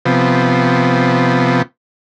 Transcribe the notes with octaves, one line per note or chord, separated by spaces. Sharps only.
C3 F3 B3